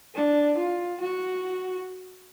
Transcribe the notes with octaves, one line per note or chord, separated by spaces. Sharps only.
D4
F4
F#4